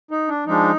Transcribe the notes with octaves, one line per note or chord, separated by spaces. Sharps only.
D#4
D4
F3 G#3 D4 D#4